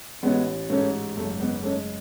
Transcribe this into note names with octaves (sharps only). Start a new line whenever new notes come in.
A1 G#3 B3
G#2 A3 C#4
F#1 A3
G#3 B3
G#3 A3 C#4